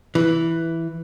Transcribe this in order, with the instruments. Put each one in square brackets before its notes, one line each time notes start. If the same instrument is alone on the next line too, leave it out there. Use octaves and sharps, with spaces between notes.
[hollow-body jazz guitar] E3